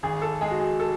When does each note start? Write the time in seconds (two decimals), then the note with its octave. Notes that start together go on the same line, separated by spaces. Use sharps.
0.03 G#1 G#4
0.22 A4
0.41 G#3 G#4
0.51 F#4
0.60 G#4
0.80 A4